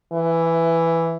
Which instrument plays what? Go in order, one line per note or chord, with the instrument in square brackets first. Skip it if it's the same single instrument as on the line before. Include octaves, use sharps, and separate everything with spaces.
[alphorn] E3